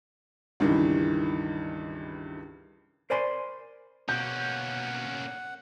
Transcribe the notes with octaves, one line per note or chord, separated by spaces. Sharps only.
C#2 G2 D#3 E3
A#4 C5 D5 G#5 B5 C6
B2 A#3 C#4 F#5 G6